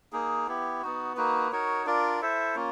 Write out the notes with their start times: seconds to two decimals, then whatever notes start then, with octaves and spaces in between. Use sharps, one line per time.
0.13 A#3 D#4 G#4
0.47 B3 E4 G4
0.82 B3 D#4 F#4
1.16 A#3 D#4 F#4 B4
1.52 D#4 F#4 A#4 C#5
1.86 D4 F4 A#4 D5
2.21 E4 A4 C5 E5
2.55 A#3 C#4 F4